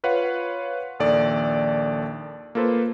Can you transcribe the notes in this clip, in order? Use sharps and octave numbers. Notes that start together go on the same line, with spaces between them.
F4 B4 C#5 F5 F#5
A#1 D#2 A4 D5
A#3 F4 A4 B4 C5